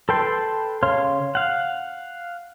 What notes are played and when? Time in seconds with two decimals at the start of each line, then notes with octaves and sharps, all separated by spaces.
0.09 A4 B4 G5 C6
0.83 C#3 C#5 F5 C6 F6
1.35 F5 F#5